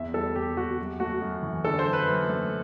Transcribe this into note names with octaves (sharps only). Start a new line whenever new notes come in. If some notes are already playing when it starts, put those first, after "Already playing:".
Already playing: E2 E5
G3 A4
E2 G4
E2 F#4
F#2
A3 F#4
F#2
E3
D3 A4
C5
F#2
B4
F#2
A3